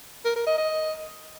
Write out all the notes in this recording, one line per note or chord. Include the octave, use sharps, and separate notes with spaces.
A#4
A#4
D#5
D#5